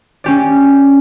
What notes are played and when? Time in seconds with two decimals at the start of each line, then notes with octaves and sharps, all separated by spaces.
0.24 C#4 G4 D5